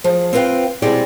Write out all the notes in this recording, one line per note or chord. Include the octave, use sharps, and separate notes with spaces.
F3 G#4
C4 F4 B4 D#5 F5 G5
B2 E3 G3 G#3 C4 D5